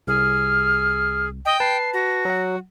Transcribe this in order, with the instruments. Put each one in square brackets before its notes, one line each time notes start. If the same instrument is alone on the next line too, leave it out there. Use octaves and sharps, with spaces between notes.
[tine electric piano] C2 [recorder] G#4 [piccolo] F6
[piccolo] D#5 [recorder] G5
[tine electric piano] B4 A5 [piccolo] C7
[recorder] F#4 [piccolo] A#6
[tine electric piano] F#3 F#5